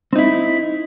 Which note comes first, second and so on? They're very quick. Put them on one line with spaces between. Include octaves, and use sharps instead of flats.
C4 D#4 E4